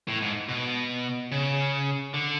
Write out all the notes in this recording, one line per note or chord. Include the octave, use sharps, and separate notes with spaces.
A2
G#2
B2
C#3
D3